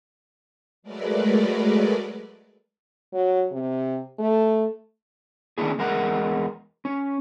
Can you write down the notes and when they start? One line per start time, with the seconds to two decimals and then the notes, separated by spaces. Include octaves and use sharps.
0.82 F#3 G#3 A3 A#4 B4 D5
3.13 F#3
3.51 C3
4.19 A3
5.58 D#3 A#3 C#4 D4 E4 G#4
5.78 E2 G#3 A#4 F#5 A#5
6.85 C#4